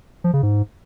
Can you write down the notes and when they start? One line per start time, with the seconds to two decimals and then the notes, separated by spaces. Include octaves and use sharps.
0.24 F3
0.33 C#3
0.43 G#2